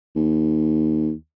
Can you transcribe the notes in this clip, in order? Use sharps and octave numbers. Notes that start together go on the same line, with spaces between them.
D#2